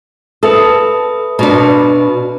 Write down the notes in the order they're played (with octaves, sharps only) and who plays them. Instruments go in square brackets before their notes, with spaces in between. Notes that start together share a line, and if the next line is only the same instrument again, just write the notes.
[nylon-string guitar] A4 [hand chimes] B4 E5 D#6
[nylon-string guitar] B2 D4 [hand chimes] B3 B4 A#5